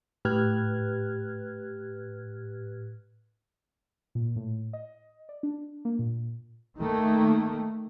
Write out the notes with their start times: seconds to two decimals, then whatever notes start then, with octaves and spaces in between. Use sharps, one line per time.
0.25 A2 G4 B4 F6 F#6 G#6
4.15 A#2
4.36 A2
4.73 D#5
5.29 D5
5.43 D4
5.85 A#3
5.99 A#2
6.78 D#3 A3 A#3